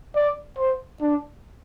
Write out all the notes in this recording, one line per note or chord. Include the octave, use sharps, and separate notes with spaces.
D5
C5
D4